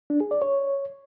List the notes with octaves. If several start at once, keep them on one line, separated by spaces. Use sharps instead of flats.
D4
G#4
D5
C#5